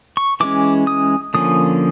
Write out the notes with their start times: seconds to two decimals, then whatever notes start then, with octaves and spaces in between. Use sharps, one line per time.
0.17 C#6
0.40 E3 G#3 C#4 D6
0.87 D#6
1.34 D3 F3 A#3 C#4 D#6